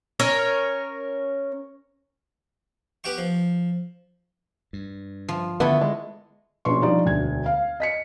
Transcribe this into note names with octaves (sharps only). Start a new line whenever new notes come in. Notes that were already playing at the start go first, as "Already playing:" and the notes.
C#4 A#4 C#5
B3 G4 F#5 G5 C#6
F3
G2
F3
D3 D#3 A3 B3 E4 A4
G#3
A#1 B2 C#4 B4 C6 C#6
F3 G3 D4 D#4 D5
E1 D2 G#6
F5
D#5 B6 C#7